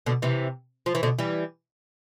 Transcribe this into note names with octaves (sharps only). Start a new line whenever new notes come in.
B2 D3
C3 E3
F3
E3
B2 D3
E3 G3